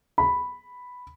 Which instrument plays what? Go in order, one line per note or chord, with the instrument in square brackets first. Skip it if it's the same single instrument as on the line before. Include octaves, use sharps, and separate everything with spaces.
[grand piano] B5